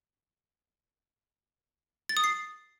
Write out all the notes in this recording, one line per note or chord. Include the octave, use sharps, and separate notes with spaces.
A6
D#6
C7